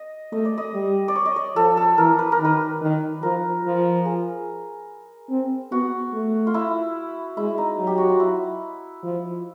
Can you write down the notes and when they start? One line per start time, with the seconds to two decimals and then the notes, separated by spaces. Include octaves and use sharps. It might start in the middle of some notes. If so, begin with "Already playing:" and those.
Already playing: D#5
0.32 A3 D#5
0.45 D5
0.58 D#5
0.74 G3
1.08 D5
1.15 C#5
1.26 D#5
1.36 D5
1.56 F3 A4
1.77 A4
1.98 E3 A#4
2.19 B4
2.32 A#4
2.39 D#3
2.45 B4
2.81 D#3
3.23 F3 A#4
3.65 F3
4.05 G#4
5.30 C4
5.71 B3 F#4
6.13 A3
6.47 F4
6.54 E4
7.37 G#3 E4
7.58 D#4
7.79 F#3
7.87 G4
7.98 F#4
8.09 F4
8.20 E4
9.03 F3